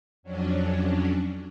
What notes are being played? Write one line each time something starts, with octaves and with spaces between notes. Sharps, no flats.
F2 F#3 C#4 D4